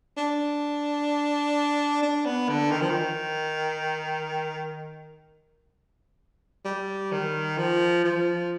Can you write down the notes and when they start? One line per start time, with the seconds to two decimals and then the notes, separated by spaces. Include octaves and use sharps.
0.17 D4
2.02 D4
2.26 B3
2.49 D3
2.71 D#3
2.81 F3
2.90 D#3
6.65 G3
7.12 D#3
7.58 F3
8.04 F3